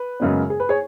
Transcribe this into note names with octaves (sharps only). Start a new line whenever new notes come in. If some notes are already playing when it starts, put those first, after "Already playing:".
Already playing: B4
F#2 C#3 G#3 B3
G#4
B4
G#4 C#5